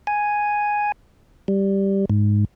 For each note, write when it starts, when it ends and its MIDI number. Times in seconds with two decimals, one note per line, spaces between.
0.07 0.92 80
1.48 2.05 55
2.10 2.45 44